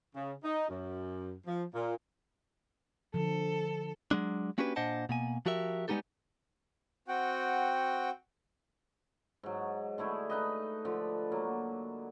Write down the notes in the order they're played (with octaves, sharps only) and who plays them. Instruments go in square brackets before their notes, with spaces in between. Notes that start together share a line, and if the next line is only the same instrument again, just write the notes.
[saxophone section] C#3
D#4
F#2
F3
A#2
[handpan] D3 F3 [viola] A4
[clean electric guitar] F#3 G#3 D4
A#3 C#4 D4 F#4 G4 B4
A#2 D4 C5 D#5 F#5 A5
B2 A#3 G#5
F3 F#4 G4 A#4 E5
G3 G#3 B3 D#4 G4 A4
[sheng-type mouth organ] C4 F#4 F#5 G5
[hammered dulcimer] G#2 F#3
D3 A3 E4 G#4
D#4 B4 D#5
D3 F3 B5
F#3 A#3